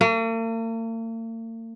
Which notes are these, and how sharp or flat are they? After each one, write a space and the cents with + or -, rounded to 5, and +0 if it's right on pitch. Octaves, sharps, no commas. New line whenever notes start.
A#3 -45